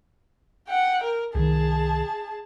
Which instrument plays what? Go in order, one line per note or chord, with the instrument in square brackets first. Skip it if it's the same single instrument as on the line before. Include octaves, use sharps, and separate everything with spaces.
[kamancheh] F#5 G5
A#4
[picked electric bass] C2 D#3 [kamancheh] G#4 A5